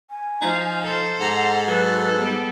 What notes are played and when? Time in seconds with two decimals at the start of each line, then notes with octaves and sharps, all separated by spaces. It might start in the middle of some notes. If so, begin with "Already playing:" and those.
0.11 G#5
0.42 F3 D#4
0.84 A4 C5
1.20 G#2 F#5 A#5
1.67 F#3 A4 B4
2.19 G3 B3 G4